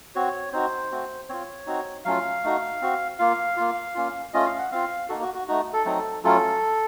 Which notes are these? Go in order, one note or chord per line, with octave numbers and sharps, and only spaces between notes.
C4 F#4 C#5
C4 D#4 F#4 C5
A3 C4 F#4
C4 F4 C#5
C4 D#4 F#4
F#3 A3 C#4 F4 F5
A3 D#4 F#4
C4 F#4
A#3 F4 F5
A#3 F4
A#3 C#4 F4
A3 C#4 F4 D#5
F5
F#5
C4 F4 F5
A#3 D#4 F#4 A4
F#4
F#4
A3 D#4 F#4
A4
F#3 A3 C4 D#4
F#3 A3 C#4 F4 A4